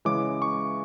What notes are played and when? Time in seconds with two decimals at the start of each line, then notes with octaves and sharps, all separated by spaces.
0.05 C#3 E3 G#3 C#4 D6
0.42 C#6